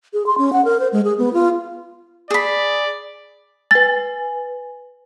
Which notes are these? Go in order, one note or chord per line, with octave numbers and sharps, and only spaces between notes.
G#4
C6
C#4
F#5
A#4
C5
G#3
G#4
B3
F4
G#4 D5 B5
B4 G#5 A6